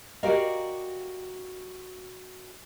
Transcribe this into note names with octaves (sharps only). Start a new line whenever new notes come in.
F#4 G4 A#4 D5 D#5 F5